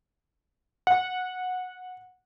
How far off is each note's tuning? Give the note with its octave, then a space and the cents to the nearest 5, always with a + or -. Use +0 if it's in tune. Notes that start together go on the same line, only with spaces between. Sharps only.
F#5 -15